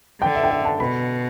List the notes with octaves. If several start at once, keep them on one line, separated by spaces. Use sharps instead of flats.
D3 G5
E5
G5
E5
A5
B2 B5